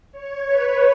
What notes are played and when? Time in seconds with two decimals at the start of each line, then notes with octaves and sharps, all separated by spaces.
0.12 C#5
0.46 B4